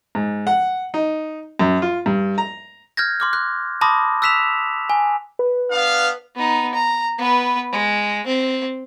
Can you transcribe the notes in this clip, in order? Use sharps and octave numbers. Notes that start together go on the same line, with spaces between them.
G#2
F#5
D#4
F#2
F4
G2
A#5
F6 G6 G#6 A#6
C6 D6 F6
F#6
A5 B5 C6 D6 D#6 A#6
E6 F#6 B6 E7 F7
G#5
B4
B3 D4 F5
B3 D#4
A#5
B3 B4
G#3
C4